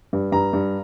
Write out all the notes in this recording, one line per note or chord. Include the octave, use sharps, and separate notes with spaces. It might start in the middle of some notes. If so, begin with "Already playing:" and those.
G2
G2 A#5
G2